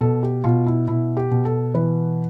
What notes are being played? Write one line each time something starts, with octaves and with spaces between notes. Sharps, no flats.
B2 A4
G4
B2 F4
E4
B2 E4
G4
B2
A4
E3 B4